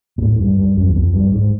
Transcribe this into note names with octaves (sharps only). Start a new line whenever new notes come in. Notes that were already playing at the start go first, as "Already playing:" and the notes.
A#2
A2
G2
G2
F#2
E2
F2
G2
G#2